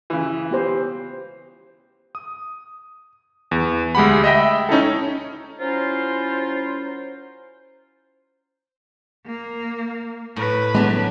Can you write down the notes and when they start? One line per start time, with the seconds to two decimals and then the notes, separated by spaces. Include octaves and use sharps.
0.10 C#3 E3
0.51 B3 G4 C5
2.15 D#6
3.51 E2
3.95 D2 G#3 G4 F#5 B5
4.24 D#5 E5 G5
4.69 C#4 D#4 E4 A4
5.60 F#3 C#4 E4 F4 A#4 C5
9.26 A#3
10.36 A2 B4
10.74 F#3 G#3 B3 D4 A5